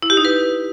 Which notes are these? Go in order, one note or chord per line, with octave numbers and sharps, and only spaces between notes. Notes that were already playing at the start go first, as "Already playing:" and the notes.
E4
G4
D#4
B4